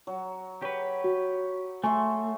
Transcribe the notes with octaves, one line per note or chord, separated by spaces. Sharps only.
F#3
G4 B4 C#5
F#4
A3 E5 G#5 C6 C#6